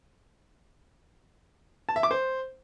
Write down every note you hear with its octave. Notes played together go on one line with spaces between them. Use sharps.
A5
E5
D6
C5